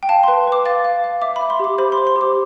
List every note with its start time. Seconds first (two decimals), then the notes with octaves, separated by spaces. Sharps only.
0.03 G5
0.09 F5 A5
0.23 B4 C6
0.47 B4 D6
0.65 F5 A6
0.84 F5
1.04 F5
1.22 E5 D6
1.36 B5
1.41 E5
1.50 C6
1.60 G4 D6
1.78 C5 B5
1.92 C6
1.98 C5
2.07 C6
2.16 G4
2.21 D6